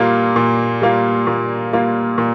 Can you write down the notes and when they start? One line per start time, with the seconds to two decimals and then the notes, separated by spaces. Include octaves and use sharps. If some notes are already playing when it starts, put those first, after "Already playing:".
Already playing: A#2 G3 A#3 F4
0.36 A#2
0.82 G3 A#3 F4
1.27 A#2
1.73 G3 A#3 F4
2.18 A#2